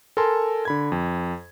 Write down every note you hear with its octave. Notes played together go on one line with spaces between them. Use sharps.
A4 A#4 G#5 A5 C6
D3 B5 G#6
F2